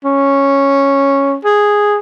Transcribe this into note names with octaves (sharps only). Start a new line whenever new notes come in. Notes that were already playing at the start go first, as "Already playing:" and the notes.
C#4
G#4